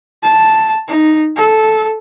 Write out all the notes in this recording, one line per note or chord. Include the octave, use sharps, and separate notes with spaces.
A5
D#4
A4